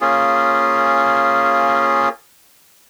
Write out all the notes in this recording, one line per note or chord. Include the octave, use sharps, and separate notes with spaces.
A#3 C#4 F4 G#4